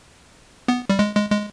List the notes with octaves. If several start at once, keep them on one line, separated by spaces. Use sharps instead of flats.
B3
G3
G#3
G#3
G#3